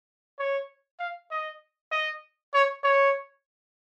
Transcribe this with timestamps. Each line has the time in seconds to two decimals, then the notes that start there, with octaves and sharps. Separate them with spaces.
0.39 C#5
0.99 F5
1.31 D#5
1.91 D#5
2.54 C#5
2.83 C#5